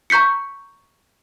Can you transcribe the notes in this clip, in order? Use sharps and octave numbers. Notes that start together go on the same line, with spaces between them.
A#5 C#6 G6 B6 C#7